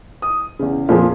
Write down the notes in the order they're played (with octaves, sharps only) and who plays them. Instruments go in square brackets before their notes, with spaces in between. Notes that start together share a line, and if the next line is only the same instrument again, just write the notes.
[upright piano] D#6
E2 C#3
[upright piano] F2 A#2 [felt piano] F3 G#4